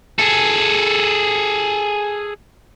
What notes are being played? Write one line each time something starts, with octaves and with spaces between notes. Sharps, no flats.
G#4 A4